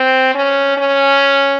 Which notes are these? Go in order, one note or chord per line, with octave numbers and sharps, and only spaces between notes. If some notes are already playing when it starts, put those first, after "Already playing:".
Already playing: C4
C#4
C#4